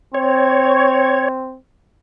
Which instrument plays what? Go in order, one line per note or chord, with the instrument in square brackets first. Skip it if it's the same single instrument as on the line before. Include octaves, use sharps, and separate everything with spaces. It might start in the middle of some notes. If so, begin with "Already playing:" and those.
[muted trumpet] C4 [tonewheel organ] C#5